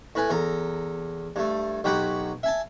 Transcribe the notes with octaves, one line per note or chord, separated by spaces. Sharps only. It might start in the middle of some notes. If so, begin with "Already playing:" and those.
A2 B4 G#5
E2 A4 A#5
G2 A3
B1 F#3 G4 F#5 G5 B5
E5 G#5 A5